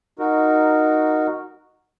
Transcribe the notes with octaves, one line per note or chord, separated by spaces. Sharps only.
D#4 F#4 A#4